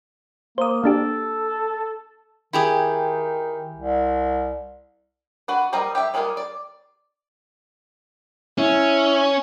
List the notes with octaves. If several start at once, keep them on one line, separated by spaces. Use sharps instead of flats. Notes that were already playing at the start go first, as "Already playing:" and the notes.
A#3 C5 D#6
A#3 D4 G4 A4
D#3 E4 G4 G#4
C2
D4 F#4 B4
F3 G3 A#3 D#5 A#5
G4 E5
G3 G#3 A#3 F4 G#4
D5
C#4 E4